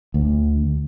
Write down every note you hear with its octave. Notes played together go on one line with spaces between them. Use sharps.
D2